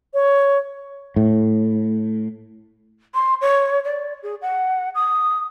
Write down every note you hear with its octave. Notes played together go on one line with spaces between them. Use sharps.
C#5
A2
C6
C#5
D5
G#4
F#5
D#6